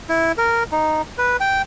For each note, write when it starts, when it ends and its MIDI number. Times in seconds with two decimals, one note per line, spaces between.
0.09 0.32 64
0.38 0.63 70
0.72 1.02 63
1.18 1.37 71
1.40 1.62 79